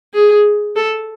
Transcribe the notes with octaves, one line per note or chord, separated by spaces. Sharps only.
G#4
A4